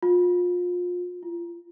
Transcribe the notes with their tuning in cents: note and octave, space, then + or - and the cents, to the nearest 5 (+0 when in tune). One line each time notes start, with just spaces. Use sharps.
F4 +30
F4 -35